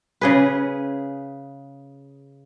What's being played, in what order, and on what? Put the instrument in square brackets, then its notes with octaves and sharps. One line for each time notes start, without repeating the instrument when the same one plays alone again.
[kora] C#3 G#4 B4